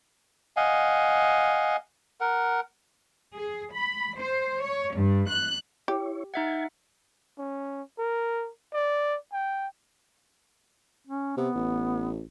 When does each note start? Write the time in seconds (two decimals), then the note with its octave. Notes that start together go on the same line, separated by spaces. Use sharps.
0.57 D#5 F5 F#5 G#5
2.20 A#4 F#5
3.34 G#4
3.72 B5
4.18 C5
4.61 C#5
4.94 G2
5.27 F#6
5.88 E4 G4 C#5
6.34 D#4 E5 F#5 G#6
7.39 C#4
7.99 A#4
8.74 D5
9.33 G5
11.07 C#4
11.37 C3 B3
11.56 A1